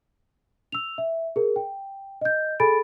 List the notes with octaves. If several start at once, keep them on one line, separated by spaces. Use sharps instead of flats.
E6 F7
E5
G#4 A#4
G5
D#5 G6
G#4 A4 G#5 B5 A6 D7